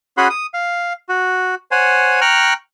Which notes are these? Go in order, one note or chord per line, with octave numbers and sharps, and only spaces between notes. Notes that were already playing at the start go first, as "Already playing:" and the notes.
C#4 F#4 G#4 F#5 B5 C6
D#6
F5
F#4
C5 C#5 F#5 G#5
G5 A#5 C#6 F6 F#6